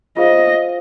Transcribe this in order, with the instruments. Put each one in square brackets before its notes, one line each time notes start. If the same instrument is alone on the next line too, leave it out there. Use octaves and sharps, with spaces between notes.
[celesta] F4 G#4 C5 F5 [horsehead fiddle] D#5